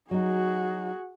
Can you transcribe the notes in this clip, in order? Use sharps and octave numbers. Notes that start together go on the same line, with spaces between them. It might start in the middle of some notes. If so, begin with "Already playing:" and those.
F#3 D#4 F#4 G#4